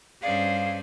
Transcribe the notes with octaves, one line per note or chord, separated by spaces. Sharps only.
G2 C#4 G#4 C5 D5 F5